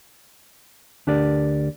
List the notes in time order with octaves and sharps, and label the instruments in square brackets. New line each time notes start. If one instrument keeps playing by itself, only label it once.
[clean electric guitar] D2 D4 G4 A#4 D5